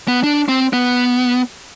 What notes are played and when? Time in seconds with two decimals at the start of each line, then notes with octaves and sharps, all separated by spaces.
0.08 B3
0.24 D4
0.48 C4
0.73 B3